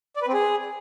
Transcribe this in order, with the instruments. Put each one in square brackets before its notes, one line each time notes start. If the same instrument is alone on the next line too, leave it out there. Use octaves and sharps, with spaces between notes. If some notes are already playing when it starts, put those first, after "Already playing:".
[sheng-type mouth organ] D5
B4
C4
G#4